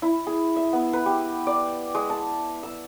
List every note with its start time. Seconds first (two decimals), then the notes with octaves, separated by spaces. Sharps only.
0.02 E4
0.27 G#4
0.56 E5
0.73 B3
0.93 B4
1.06 G4
1.47 D5
1.95 G#3
2.10 A5
2.63 E6